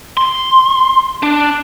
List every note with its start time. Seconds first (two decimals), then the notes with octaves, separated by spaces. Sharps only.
0.17 C6
1.23 D4